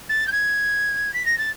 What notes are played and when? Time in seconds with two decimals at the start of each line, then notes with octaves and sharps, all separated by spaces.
0.09 A6
0.27 G6
0.32 G#6
1.14 B6
1.26 A#6
1.38 A6